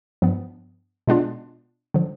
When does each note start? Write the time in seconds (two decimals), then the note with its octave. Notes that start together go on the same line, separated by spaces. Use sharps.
0.22 G2 F3 B3
1.07 B2 G#3 B3 D4 F4
1.94 D3 F3